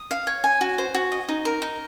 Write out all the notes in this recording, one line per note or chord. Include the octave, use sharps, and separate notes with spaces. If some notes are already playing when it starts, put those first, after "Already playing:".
Already playing: D#6
F5
C#5
G#5
F#4
C5
F#4
D#5
D#4
A#4
D#4